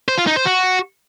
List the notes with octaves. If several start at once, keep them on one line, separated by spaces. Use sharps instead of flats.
C5
F4
D#4
C5
F#4